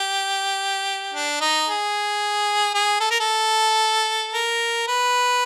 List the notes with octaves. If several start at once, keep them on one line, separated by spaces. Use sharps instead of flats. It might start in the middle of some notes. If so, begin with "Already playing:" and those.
Already playing: G4
D4
D#4
G#4
G#4
A4
A#4
A4
A#4
B4